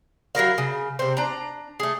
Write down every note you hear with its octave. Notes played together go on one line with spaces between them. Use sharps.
F#3 E4 A#4 F5
C#3
C3 C4
D4 A#5
A3 G#4